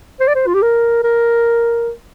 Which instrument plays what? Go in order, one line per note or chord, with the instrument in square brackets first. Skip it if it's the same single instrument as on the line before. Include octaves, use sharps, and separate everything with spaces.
[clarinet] C5
D5
C5
F4
G4
A#4
A#4